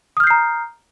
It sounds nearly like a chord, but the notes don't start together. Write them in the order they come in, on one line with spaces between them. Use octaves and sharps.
D#6 F6 G6 C7 A#5